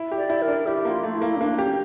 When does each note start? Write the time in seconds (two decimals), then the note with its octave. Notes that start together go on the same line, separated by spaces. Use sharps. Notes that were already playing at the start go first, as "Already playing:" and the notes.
Already playing: E4
0.12 G4
0.17 D5
0.30 E4
0.42 A#4
0.48 D4
0.66 E4 G4
0.85 A#3
0.90 F4
1.03 A3
1.15 E4
1.21 A#3
1.36 C#4
1.41 A#3 D4
1.58 C#4 G4